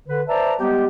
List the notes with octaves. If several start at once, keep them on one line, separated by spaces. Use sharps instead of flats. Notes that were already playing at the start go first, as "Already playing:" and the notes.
D3 B4
B4 C5 D5 E5 A5 A#5
G3 G#3 B3 G4